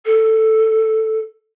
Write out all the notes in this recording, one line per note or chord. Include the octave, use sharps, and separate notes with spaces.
A4